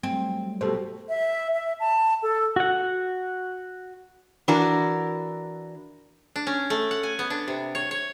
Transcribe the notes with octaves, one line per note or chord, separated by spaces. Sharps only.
F#3 G3 A3 C4
B2 G4 A4 C5
E5
E5
A5
A4
F#4 F#5
E3 D4 F#4 A#4
D4
C#4
A3
F#5
G#5
B3
D4
C3
C#5
C#5